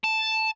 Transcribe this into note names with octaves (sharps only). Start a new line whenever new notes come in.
A5